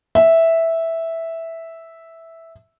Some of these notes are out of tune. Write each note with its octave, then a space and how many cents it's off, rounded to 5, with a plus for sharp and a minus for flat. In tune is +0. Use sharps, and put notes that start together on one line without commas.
E5 -5